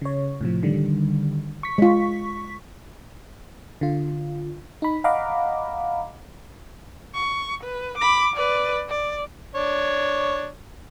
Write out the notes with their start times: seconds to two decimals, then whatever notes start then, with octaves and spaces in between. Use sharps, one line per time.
0.01 C#3 C#5
0.41 A2 C3 F3
0.63 D3 D#3 G3
1.63 C#6 B6
1.78 G#3 F4
3.81 D3 F4
4.82 D#4 B5
5.04 D#5 F5 F#5 A#5 B5 D6
7.14 C#6
7.63 B4
7.97 B5 D6
8.35 B4 D5
8.89 D5
9.55 D4 C#5